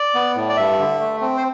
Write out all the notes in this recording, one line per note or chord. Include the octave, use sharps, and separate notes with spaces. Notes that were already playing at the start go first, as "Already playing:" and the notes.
Already playing: D5
B3
A2
D5
G2 E5
D3
A3
C4
C5